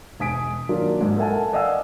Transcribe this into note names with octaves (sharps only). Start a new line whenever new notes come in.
E1 G#5 D#6 B6 D7
D#3 F#3 A#3 D4 F4
G#2 G#3
A4 A#4 E5 F#5 G#5 A5
D5 D#5 F5 F#5 G#5 E6